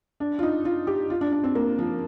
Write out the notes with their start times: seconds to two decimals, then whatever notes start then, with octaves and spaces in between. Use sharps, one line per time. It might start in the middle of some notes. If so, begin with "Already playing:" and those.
0.20 D4
0.39 F4
0.43 D#4
0.65 F4
0.87 G4
1.10 F4
1.21 D4
1.32 D4
1.44 C4
1.55 A#3
1.78 F3